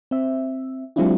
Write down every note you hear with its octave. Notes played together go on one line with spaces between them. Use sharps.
C4 E5
F#3 G#3 C4 D4 E4 F4